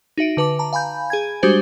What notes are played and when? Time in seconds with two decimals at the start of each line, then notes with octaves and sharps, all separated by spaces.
0.18 D#4 F#4 E5 D7
0.37 D3 B4 A5 D6
0.59 A5 A#5
0.73 F5 G#5 B5 G6
1.10 G#4 G#5 G#6
1.43 G3 G#3 D4 F#4 G4 C5